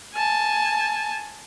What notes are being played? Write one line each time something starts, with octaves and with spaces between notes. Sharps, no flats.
G#5 A5